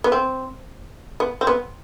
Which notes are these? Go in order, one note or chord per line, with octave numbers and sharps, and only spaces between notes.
B3
C4
B3
C4
B3